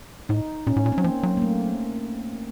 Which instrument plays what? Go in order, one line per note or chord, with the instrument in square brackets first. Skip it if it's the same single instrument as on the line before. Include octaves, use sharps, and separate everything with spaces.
[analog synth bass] A2 [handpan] D#4
[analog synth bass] A#2 [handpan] C#4
[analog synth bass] A2
A#2
[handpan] C4
[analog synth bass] F#3
[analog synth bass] F3 [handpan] A#3
[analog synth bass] F#3
[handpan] A#3
A3